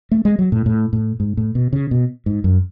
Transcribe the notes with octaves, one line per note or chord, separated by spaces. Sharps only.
A3
G#3
F#3
A2
A2
A2
G#2
A2
B2
C#3
B2
G#2
F#2